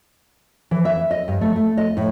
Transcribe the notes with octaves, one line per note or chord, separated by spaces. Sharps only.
E3
E5
D#5
G2
A3
A3
D#5
A2